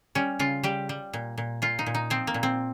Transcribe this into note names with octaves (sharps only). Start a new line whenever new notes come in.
G3 C#4
C#3 F4
G3 G4
G3
A#2
A#2
A#2 F4
D#4
A#2
D#4
F3 C4
A#3
A#2
C4